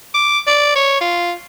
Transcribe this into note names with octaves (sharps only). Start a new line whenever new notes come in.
D6
D5
C#5
F4